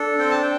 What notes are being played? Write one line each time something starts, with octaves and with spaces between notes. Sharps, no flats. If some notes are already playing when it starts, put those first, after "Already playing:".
Already playing: D4 A4
C4 G5
A5
G5